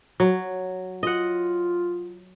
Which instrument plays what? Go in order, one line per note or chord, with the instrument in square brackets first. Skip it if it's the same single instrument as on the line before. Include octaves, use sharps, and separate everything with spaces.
[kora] F#3
[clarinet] F4 [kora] D#5 F#5